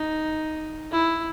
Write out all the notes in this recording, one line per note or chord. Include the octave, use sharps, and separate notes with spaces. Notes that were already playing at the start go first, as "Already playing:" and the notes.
Already playing: D#4
E4